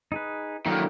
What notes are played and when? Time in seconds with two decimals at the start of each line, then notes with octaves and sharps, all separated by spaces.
0.12 D#4 G#4 B4
0.66 D3 D#3 F#3 A#3 E4